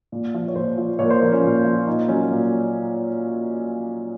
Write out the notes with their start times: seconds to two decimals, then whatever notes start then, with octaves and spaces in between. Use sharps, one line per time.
0.12 A#2
0.34 F3
0.48 C#5
0.56 A#2 C5
0.78 F3
0.99 A#2 C#5
1.05 A#4
1.10 C5
1.21 F3 A#4
1.32 C#4
1.44 A#2
1.65 F3
1.87 A#2 D#4
2.09 F#3 C#4
2.31 A#2